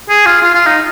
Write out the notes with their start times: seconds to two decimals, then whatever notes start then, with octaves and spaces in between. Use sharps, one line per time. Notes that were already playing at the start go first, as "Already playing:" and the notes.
0.10 G#4
0.26 F4
0.42 F4
0.55 F4
0.66 D#4